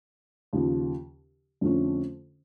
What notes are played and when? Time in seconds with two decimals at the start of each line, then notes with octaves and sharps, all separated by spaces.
0.53 D#2 C#3 F3
1.61 F2 D3 F3 A3 C#4